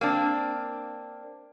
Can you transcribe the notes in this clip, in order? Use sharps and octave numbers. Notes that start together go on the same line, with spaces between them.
A#3 C4 D4